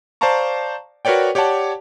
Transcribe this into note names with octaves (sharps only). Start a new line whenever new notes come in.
C5 D5 F5 A5 A#5 C#6
F#4 A#4 B4 C#5 D5 G5
G4 C#5 D5 F#5 A5